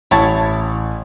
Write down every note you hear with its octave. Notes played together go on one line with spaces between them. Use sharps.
A1 E4 C#5 A5